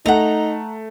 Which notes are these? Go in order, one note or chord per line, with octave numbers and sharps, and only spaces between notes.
A3 D#4 F#5 A#5